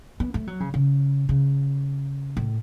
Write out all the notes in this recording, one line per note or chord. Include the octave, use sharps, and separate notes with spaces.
B3
A3
F#3
C#3
C#3
C#3
A2